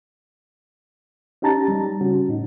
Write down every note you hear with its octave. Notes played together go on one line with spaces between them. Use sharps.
C#4 D#4 G4 A5 A#5 A6
G3
C#3 C#4 F#4
A2 D#4